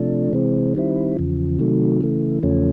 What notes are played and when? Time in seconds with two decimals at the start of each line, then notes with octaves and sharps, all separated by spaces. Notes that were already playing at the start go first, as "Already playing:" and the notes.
Already playing: C3 F3 A3 D4
0.33 C3 E3 G#3 C4
0.75 D#3 G3 C4 E4
1.17 E2 C#3 F3
1.59 C3 D#3 F#3 A3
2.01 C#3 E3 A3
2.43 E2 C#3 F3 A3 C#4